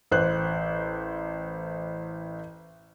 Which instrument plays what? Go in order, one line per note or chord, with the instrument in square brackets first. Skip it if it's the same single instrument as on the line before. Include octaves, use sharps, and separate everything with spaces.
[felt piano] A1 C5 F#6